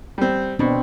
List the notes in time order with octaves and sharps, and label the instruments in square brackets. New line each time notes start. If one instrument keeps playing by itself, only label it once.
[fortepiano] G3 C4
[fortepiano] B2 [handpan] C4 D4